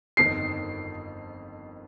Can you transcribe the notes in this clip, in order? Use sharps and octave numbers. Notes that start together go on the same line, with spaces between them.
G1 F2 D#3 C7